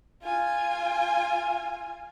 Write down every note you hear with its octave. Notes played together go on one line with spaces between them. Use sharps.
F4 G#5